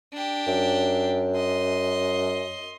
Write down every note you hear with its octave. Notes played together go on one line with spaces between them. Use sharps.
D4 G4
F#2
D#5 C6